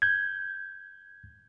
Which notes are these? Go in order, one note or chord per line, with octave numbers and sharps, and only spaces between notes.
G6 G#6